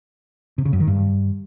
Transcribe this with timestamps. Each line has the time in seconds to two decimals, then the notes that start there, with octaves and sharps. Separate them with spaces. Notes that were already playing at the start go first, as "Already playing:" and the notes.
0.58 C3
0.65 C#3
0.73 F#2
0.80 D#3
0.87 G2